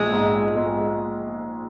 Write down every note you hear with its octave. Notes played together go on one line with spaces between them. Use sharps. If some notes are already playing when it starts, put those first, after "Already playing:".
Already playing: A#1 G#3
G#2
G#3